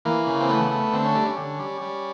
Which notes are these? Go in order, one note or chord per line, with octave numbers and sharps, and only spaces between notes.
E3 A#3
C#3
C4
A3 B3
A3
D3 C4
C#4
G3 D4
C#4
D3
G3
G3